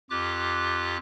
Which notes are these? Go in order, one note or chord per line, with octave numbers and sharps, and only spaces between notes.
F2 F4 G4 D6 F#6